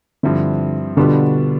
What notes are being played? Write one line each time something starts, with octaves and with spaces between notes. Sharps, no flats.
G2 D3 F3 C4 E4
B2 D3 G3 B3 D4 F4